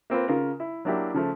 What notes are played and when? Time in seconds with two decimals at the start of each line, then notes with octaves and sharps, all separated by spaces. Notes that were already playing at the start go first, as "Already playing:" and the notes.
0.10 A#3 C4 F4 B4
0.28 C#3 F4 A#4
0.60 E4
0.85 F#3 A#3 D4 E4 G4
1.14 C#3 F3 A3